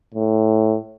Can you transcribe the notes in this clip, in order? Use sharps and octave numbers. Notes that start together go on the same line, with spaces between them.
A2